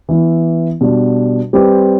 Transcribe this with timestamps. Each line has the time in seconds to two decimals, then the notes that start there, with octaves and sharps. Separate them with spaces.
0.09 E3 B3 E4
0.81 B2 G3 D4
1.53 G3 C4 G4 B4